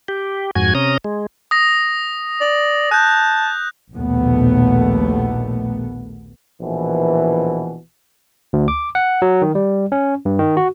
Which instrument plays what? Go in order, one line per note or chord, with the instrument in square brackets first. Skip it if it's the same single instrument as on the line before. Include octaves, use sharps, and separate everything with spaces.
[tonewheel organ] G4
F2 G#2 F#4 G#5 G#6
C3 C#4 A#5 D#6
G#3
[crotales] D#6 A#6
[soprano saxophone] D5
[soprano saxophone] A5 [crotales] F#6 G6
[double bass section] A#1 D#2 B2 A3 B3
[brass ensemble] A#1 B2 E3
[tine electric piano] D2
D6
F#5
F#3
D#3
G3
C#4
G2
D#3
F#4